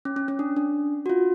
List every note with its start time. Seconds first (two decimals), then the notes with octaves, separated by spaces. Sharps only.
0.05 C#4
0.16 C#4
0.28 C#4
0.39 D4
0.57 D4
1.06 F#4
1.10 F4